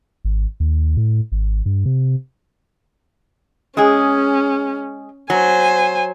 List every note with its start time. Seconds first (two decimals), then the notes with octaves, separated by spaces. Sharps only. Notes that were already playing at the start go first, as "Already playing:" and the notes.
0.25 G#1
0.60 D#2
0.97 A2
1.32 G#1
1.66 G2
1.86 C3
3.77 G#3 C#4 G#4
5.30 F#3 C5 G#5